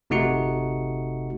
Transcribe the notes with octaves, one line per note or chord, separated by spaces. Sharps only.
G1 C3 A3 D#4 F#4 C#7